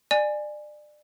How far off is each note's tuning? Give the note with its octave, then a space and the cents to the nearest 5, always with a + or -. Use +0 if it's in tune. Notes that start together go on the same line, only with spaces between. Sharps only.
D5 +25 G#5 +0